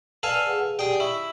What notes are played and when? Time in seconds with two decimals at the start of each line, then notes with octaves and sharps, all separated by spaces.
0.23 A4 B4 D5 F5 G#5 F#7
0.47 G#4 B4 F#5
0.79 G4 G#4 D5 G5 D#6
1.00 E4 C#6